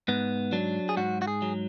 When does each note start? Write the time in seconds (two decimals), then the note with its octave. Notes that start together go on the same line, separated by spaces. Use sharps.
0.08 G#2 B3
0.52 F#3 D4
0.89 G#4
0.97 G#2 F#4
1.22 F#4
1.27 G#4
1.42 F#3